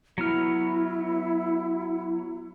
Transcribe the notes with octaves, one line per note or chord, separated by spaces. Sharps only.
F#3 B3 E4 F6